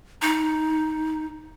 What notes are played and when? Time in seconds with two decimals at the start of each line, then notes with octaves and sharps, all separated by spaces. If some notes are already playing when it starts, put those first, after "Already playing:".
0.22 D#4